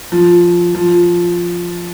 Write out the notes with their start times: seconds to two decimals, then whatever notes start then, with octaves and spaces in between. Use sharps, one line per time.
0.12 F3
0.75 F3